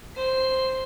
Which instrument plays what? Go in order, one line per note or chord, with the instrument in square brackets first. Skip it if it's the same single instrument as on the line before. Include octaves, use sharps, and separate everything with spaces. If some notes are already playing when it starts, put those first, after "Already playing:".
[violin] C5 C7